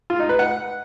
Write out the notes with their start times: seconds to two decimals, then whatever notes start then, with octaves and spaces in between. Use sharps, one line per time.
0.10 F4
0.20 D#4
0.29 B4
0.39 F#5